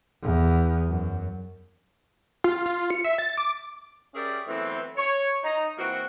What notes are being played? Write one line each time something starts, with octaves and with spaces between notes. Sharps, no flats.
E2
F#2
F4
F4
C#7
E5
A6
D6
C#4 G4 G#4 A#4 D5 E5
E3 F#3 A3 B3 C4
C#5
D#4 A#5
E3 A#3 C4 F#4